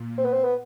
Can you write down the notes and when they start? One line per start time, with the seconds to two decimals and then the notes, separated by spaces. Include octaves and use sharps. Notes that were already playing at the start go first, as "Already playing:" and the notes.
Already playing: A#2
0.18 C4
0.25 B3
0.33 C4
0.44 B3